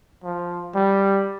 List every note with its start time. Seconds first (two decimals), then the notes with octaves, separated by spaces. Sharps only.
0.24 F3
0.75 G3